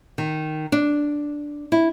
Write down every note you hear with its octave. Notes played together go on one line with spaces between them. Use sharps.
D#3
D4
E4